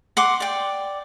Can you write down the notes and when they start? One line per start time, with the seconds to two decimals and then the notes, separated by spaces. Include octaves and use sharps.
0.17 F#5 C6 D6
0.40 D5 G5